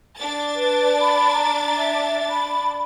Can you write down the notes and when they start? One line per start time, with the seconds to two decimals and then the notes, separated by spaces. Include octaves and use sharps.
0.17 D4 A6
0.55 B4
1.00 B5
1.33 A#5
1.77 E5
2.29 B5